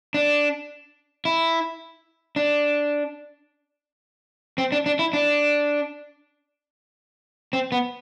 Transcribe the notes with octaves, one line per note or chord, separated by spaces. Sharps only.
D4
E4
D4
C4
D4
D4
E4
D4
C4
B3